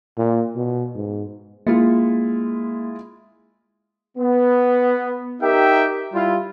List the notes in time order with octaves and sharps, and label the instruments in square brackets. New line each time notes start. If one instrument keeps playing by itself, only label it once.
[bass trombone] A#2
B2
G#2
[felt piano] G#3 E4 F4 [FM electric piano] A#3
[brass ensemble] B3
D#4 G4 A#4 E5 G5
G3 E4 F4